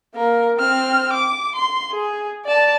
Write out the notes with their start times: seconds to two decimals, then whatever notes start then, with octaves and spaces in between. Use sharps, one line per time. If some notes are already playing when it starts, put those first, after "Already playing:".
0.15 A#3 A#4
0.56 C4 F6
1.13 D6
1.56 C6
1.91 G#4
2.45 D5 A5